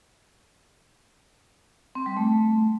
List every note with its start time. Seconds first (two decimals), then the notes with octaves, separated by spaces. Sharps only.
1.95 C4
2.06 G3
2.17 A3